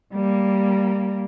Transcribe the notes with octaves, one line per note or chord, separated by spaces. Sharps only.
G3 A#3